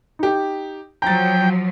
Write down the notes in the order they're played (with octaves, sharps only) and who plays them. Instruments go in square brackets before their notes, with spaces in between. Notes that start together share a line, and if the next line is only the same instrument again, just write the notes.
[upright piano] D#4 G4
[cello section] F3 F#3 [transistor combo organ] G5 [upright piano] A#5 A6